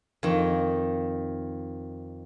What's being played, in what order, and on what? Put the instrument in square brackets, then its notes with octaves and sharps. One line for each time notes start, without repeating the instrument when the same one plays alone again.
[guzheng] F2 D#3